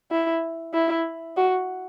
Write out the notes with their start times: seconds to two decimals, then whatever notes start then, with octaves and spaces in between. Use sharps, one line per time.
0.11 E4
0.74 E4
1.37 F#4